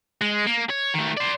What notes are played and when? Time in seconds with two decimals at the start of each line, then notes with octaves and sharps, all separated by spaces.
0.21 G#3
0.47 A#3
0.70 C#5
0.94 D#3 A3
1.17 C5 D5